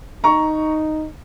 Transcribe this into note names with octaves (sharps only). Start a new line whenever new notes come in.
D#4 A#5 C#6